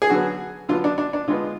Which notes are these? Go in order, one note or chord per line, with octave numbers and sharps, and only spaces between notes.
G#4
D3 F#3 B3 F#4
D3 F#3 B3 F4
D4
D4
D4
D3 G#3 B3 F4